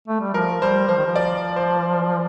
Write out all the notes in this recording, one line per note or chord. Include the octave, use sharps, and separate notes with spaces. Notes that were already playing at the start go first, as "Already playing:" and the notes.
A3
G3
F3 A#4
G3 C5
F3 C5
D#3
F3
D5
C5